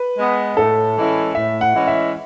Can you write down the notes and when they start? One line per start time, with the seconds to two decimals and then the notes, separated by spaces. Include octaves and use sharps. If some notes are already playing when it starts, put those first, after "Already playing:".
Already playing: B4
0.18 G#3 B3
0.57 A2 A4
0.97 E3 G#3 C#4 E4
1.35 A2 E5
1.61 F#5
1.75 E3 G#3 C#4 E4
1.87 E5